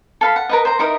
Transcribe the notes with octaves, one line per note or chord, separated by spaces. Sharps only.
A4 F5 B5
F#5
A#4 B4 D#5
C5 A#5
D#4 E4 A#4 D#5